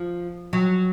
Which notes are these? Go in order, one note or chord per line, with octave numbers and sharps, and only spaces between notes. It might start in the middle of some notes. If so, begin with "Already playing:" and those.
Already playing: F3
F#3